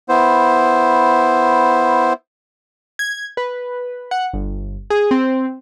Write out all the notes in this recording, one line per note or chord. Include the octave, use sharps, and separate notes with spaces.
B3 E4 C5
G#6
B4
F#5
G1
G#4
C4